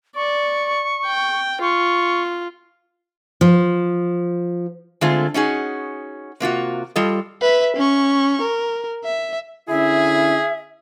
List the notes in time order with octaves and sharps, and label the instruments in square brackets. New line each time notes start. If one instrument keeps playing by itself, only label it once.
[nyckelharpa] D5 [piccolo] C#6
[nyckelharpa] G5
[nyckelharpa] F4 [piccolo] C#6
[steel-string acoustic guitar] F3
[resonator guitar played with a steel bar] D3 G#3 A3 C4 F4
C#4 D#4 F#4 G#4
C3 A#3 F4 F#4
G3 F4 A4 D#5
[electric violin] B4 E5
C#4 C#6
A#4
E5
[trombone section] D3 C#4 E4 [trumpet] G#4 [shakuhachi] E5